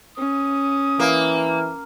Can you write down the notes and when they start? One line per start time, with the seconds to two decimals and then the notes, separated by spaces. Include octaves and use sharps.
0.18 C#4 D#6
1.00 E3 A#3